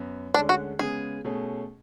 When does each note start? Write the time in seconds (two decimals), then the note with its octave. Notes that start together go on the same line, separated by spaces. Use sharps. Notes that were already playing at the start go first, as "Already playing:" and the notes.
Already playing: F#2 B3
0.34 D2 D3 G#3 C#4 D4
0.49 F#4
0.79 C#3 G#3 B3 G#4
1.24 B2 A3 C#4 G#4